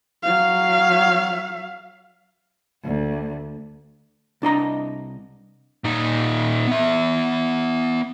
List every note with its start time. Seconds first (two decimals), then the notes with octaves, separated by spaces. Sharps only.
0.23 F#3 F5
2.85 D2
4.42 C2 D4 D#5 A#5
5.84 A#2 D#4
6.67 B3 E5